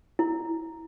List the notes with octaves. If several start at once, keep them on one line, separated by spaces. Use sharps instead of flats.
E4